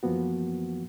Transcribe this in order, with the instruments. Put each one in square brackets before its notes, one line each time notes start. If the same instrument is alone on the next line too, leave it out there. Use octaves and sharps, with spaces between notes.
[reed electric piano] F#2 E3 F3 A#3 B3 F#4